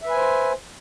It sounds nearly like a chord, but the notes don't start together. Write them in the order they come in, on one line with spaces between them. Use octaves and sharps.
E5 B4 G#5 C5